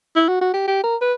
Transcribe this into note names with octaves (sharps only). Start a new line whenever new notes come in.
E4
F#4
F#4
G4
G4
A#4
B4